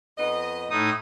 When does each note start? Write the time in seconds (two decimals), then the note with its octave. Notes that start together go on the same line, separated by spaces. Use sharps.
0.18 F2 B3 D#5
0.70 A2 D#4 D#6